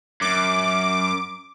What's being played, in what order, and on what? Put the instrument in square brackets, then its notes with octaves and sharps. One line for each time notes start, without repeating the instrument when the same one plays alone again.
[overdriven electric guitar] F#2 [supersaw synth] D6